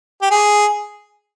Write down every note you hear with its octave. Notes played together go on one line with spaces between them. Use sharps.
G4
G#4